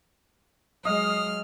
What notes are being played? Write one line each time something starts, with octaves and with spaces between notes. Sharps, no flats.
F#3 G#3 D#5 F5 D#6 F6